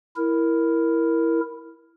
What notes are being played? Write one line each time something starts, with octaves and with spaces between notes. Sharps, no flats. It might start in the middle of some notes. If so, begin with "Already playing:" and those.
E4 A#4